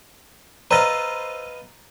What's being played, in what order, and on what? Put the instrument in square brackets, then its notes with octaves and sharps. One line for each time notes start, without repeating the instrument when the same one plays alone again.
[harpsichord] B4 D#5 F5 [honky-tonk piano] C5 E6 A6 [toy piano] A#5